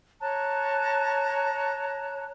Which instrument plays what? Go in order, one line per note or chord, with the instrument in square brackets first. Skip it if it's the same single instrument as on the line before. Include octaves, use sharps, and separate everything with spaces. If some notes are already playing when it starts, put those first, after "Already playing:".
[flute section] C#5 A5 A#5 F#6